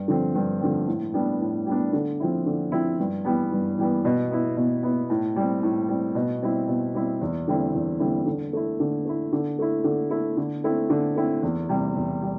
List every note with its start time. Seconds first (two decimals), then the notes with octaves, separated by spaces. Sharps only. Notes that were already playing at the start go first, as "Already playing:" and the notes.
Already playing: G2
0.08 D3 F3 C4
0.35 G2
0.61 D3 F3 C4
0.87 A2
1.14 G3 B3 D4
1.40 A2
1.67 G3 B3 D4
1.93 D3
2.20 F3 C4 E4
2.46 D3
2.72 F3 C4 E4
2.99 G2
3.25 E3 G3 B3
3.52 G2
3.78 E3 G3 B3
4.05 B2
4.31 B3 E4
4.57 B2
4.83 B3 E4
5.10 A2
5.36 G3 C4
5.63 A2
5.89 G3 C4
6.15 B2
6.42 G3 C4 E4
6.68 B2
6.95 G3 C4 E4
7.21 E2
7.48 D3 G3 C4 E4
7.74 E2
8.00 D3 G3 C4 E4
8.26 D3
8.53 A3 E4
8.80 D3
9.05 A3 E4
9.32 D3
9.59 A3 E4
9.84 D3
10.11 A3 E4
10.37 D3
10.64 A3 C4 E4
10.90 D3
11.16 A3 C4 E4
11.43 E2
11.69 C3 G3
11.96 E2
12.22 G3